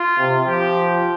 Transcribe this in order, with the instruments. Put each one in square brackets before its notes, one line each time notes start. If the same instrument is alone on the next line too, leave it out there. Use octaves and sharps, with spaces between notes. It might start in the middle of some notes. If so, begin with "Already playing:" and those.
Already playing: [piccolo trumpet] F4
[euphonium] C3
[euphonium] F3 [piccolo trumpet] G4